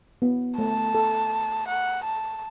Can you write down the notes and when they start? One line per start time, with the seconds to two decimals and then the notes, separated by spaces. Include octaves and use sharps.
0.22 B3
0.58 A3 A5
0.95 A4
1.68 F#5
2.04 A5